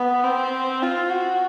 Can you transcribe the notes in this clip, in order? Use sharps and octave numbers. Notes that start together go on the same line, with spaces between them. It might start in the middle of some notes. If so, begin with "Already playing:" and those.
Already playing: B3
C4
F4
F#4